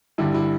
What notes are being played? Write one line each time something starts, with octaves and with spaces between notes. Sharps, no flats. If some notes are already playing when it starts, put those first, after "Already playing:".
G2 D3 G3 E4
E4